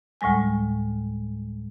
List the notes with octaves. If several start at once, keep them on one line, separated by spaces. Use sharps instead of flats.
D2 A2 G3 G#3 G#5